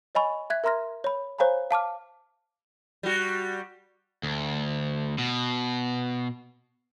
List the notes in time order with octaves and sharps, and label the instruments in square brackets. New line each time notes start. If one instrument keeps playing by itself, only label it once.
[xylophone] C#5 D#5 G#5 B5 C#6
E5 F#6 G#6 B6
A#4 E5 A#5 C6 F6 A#6
C#5 B5
C5 C#5 F5 G#5 A#5 B5
F5 A5 D6 F6
[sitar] G3 F#4
[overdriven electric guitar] D2
B2